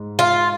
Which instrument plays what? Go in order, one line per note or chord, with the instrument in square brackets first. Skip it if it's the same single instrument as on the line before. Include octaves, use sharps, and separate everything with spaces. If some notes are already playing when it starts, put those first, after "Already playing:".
Already playing: [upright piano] G#2
[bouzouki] F4